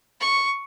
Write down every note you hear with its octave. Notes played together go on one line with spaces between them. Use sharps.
C#6